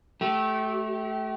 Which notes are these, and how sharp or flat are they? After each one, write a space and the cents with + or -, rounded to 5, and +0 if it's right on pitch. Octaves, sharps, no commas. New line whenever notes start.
A3 -20 G4 -30